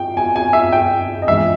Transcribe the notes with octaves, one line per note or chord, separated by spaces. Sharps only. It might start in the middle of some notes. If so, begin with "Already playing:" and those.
Already playing: G5
G#5
G#5
E5
G5
D#5
A#1 G#2 E3 E5